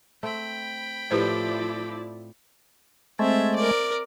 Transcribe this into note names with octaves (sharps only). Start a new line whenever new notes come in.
A3 C4 G5 B5
A2 F3 C4 E4 G4 B4 C5 D5
G#3 A3 C4 E5
A#4 D5